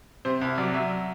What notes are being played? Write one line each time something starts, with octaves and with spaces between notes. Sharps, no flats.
C3 C5
C2
F#3 D5
F#3 E5